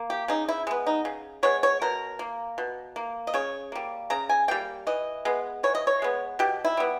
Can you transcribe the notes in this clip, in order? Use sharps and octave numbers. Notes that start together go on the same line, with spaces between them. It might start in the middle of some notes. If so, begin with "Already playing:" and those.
Already playing: A#3
G4
C#3 D#4
E4
G#3 B3
D#4
C#3
G#3 B3 C#5
C#5
B2 A#4
A#3
B2
A#3
D#5
C#3 C#5
G3 A#3
C#3 A#5
G#5
G3 A#3 G5
E3 D#5
G#3 B3
E3 C#5
D#5
C#5
G#3 B3
B2 G4
E4
G3 B3